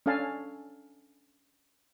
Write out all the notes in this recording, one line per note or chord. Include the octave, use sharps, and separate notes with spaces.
C#4 D4 A4 F5 G#5 A5